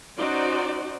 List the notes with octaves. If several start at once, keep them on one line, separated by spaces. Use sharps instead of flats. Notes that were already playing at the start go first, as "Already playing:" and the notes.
C#4 D#4 F#4 C5 D5